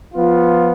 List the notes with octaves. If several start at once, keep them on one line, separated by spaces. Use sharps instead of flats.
F3 B3 F4